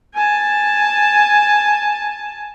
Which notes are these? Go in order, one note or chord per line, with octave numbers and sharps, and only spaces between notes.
G#5 A5